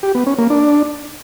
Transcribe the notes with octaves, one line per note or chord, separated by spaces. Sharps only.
G4
B3
C#4
A#3
D4